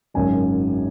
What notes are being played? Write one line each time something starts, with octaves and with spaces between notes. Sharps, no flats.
G#1 F#2 C#3 F#3 G#5